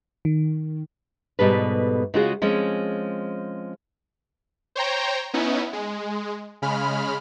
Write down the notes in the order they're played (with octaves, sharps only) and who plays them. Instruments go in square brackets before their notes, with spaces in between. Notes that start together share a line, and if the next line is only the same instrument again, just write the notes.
[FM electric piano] D#3
[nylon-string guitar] G#2 B2 G3 A4 B4
C#3 G#3 F4 F#4 G#4
F3 G#3 C4 C#4
[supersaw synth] C5 C#5 G5 A#5
B3 C#4 D#4 E4
G#3
C#3 G#3 B5 F6